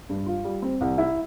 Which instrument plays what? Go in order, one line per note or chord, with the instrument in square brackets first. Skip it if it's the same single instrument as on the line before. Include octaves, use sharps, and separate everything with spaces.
[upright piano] G2
F4
G3
C4
C2
E4